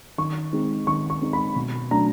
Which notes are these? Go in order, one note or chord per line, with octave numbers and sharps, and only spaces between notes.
D#3 C#6
G#3 C4 D#4
D#3 C#6
C#6
G#3 C4 D#4
B5
B2
F#3 A3 D4 A#5